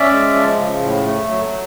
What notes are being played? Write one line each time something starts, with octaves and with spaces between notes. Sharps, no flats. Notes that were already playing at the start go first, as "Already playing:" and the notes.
Already playing: C#4 D5 E5
G#3
F3
C#3
A2
A3
F#3